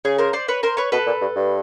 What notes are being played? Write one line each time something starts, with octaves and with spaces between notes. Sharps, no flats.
C#3 G#4
A#4 C5
C5 D5
B4 C#5
A#4 C5
B4 C#5
B2 A4 B4
A#2
G2
G2